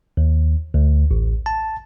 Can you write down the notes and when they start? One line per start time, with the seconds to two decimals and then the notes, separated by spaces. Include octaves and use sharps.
0.17 D#2
0.74 D2
1.11 A1
1.46 A5